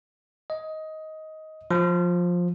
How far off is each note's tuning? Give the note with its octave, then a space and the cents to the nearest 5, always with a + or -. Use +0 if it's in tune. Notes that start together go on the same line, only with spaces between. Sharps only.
D#5 +15
F3 +15